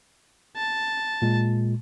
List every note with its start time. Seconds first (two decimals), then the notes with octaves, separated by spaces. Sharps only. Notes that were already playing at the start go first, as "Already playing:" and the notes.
0.57 A5
1.22 A#2 G#3